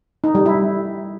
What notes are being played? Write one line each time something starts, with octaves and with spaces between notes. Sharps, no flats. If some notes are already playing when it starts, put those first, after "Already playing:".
D#4
G3
E4